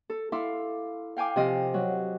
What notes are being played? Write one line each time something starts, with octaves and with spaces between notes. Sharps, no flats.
A4
E4 A4 E5 F5 C6 D6
F5 G5 G#5 D6
C3 F3 D#5 F5
F#3